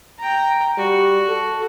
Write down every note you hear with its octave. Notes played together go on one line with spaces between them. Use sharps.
G5 A#5
G3 F#4
A4